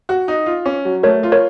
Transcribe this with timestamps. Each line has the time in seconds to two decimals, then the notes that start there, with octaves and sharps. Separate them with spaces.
0.09 F#4
0.28 D#4
0.46 F4
0.66 C#4
0.85 F#3
1.03 A3 A#4 C#5
1.23 F4
1.32 A#4 C#5